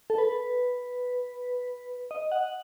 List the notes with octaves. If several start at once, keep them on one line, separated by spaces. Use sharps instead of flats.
A4
B4
D#5
F#5